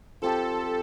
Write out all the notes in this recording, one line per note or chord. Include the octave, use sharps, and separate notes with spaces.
F3 C4 G4 A4